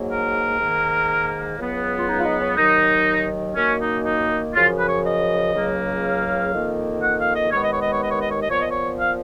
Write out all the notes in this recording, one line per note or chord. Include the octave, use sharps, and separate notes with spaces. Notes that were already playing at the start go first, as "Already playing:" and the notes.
Already playing: G#2 F#3 A#3
A#4
G#2 D#3 A#3
C#2 C#3 F#3 B3
F4
D#4
F4
D#4
C#4
D#2 D#3 F#3 D#4
F#2 D#3 A#3 C#4
D#4
D#4
F#2 C#3 F3 F4
B4
C#5
D#5
C#2 C#3 F#3 A#3
F5
F2 D#3 A#3
F#5
F5
D#5
D#2 D#3 G#3 B3 C#5
D#5
C#5
D#5
C#5
D#5
C#5
D#5
C#5
D#5
A#2 F3 B3 C#5
D#5
C#5
F5